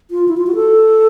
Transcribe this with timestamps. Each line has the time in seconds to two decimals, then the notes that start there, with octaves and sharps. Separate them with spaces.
0.11 F4
0.28 E4
0.37 F4
0.47 F#4
0.55 A4